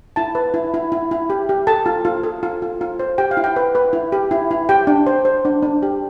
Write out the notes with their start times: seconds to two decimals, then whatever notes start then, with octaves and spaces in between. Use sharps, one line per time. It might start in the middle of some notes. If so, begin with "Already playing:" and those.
0.16 E4 A5
0.35 B4
0.54 E4
0.74 E4
0.92 E4
1.11 E4
1.30 G4
1.49 G4
1.67 A4 A5
1.86 F4
2.05 F4
2.23 A4
2.43 F4
2.62 F4
2.81 F4
2.99 C5
3.18 G4 G5
3.31 F5
3.37 E4
3.44 G5
3.56 B4
3.75 B4
3.93 E4
4.12 G4
4.31 E4
4.51 E4
4.69 G4 G5
4.87 D4
5.07 C5
5.25 C5
5.45 D4
5.63 D4
5.82 G4